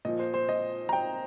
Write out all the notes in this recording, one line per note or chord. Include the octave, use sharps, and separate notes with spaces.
A#2 F3 D#5
C5
C5
D#5
A#5
G5